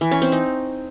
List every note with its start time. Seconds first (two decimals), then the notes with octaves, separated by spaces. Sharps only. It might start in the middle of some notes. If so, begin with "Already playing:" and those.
0.01 E3
0.11 C#4
0.22 C4
0.32 D#4